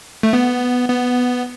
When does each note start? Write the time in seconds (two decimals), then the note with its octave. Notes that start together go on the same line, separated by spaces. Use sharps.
0.23 A3
0.33 B3
0.89 B3